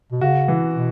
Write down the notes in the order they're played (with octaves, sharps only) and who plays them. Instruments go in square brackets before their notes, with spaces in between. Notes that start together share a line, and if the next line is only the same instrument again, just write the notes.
[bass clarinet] B2
[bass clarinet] C#3 [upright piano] F#4
[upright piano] E3
[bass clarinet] B2